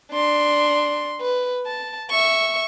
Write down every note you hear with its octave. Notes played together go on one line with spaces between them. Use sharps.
D4 C6
B4
A5
E5 C#6